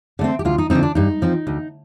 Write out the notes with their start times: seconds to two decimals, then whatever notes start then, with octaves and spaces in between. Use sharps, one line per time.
0.19 D3 A3 C4
0.39 G4
0.45 D2 F4
0.58 D#4
0.70 D3 F3 C4 D#4
0.83 D4
0.95 G2 D#4
1.22 F3 C4
1.47 D2